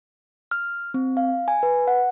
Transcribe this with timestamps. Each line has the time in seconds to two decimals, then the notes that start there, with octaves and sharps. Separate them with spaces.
0.51 F6
0.94 C4
1.17 F5
1.48 G#5
1.63 B4
1.87 F#5